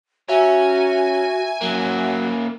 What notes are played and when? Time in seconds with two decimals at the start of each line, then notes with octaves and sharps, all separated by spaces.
0.29 C#4 F#4 E5 G#5 A#5
1.61 F#3 A#3 C#4